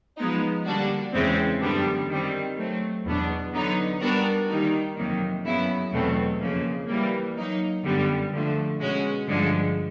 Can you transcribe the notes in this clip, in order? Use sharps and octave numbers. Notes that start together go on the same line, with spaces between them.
F3 G#3 B3 D#4
D3 G3 A#3 D4 F#4
E2 C#3 E3 G#3 C4
F#2 D3 G3 B3 D4
D#3 G3 C4
F#3 A3 C4
E2 B2 F#3 B3 D4
D3 F#3 B3 D#4
G3 B3 D4 F#4 A#4
D#3 G3 A#3 D#4
F2 C3 D#3 F#3 A#3
F#2 C#3 F#3 B3 E4
E2 B2 F#3 A3 C4
F2 C#3 F3 A#3
E3 G3 A#3
F#3 A#3 D#4
F#2 D3 G3 B3
D3 F3 A3
B2 G#3 C#4 F#4
G2 D3 F3 G#3